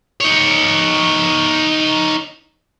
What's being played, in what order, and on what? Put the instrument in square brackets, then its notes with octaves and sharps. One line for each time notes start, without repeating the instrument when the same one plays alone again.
[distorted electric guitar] D#4 C#5